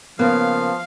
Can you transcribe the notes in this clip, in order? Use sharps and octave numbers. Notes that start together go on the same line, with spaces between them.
C#3 F3 A#3 B3 F5